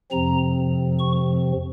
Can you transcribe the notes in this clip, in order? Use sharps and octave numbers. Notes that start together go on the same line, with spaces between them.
F2 C3 F3 C4 A#5
C#6